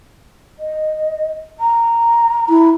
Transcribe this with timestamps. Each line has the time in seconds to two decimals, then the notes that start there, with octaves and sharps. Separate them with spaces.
0.59 D#5
1.60 A#5
2.49 E4